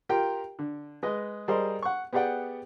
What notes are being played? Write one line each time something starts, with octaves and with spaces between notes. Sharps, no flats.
F4 G4 A#4 G5
D3
G#3 B4 D#5
G3 G#4 A#4 C5 D#5
F#5 C#6
B3 G4 G#4 D5 F#5 G5